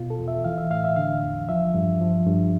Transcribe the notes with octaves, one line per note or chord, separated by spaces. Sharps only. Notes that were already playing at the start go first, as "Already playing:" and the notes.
Already playing: B2 F4
A4
E2
E5
E3 F5
E5
A2 F5
E5
D3 F5
E2
F3 E5
G2
F3
G2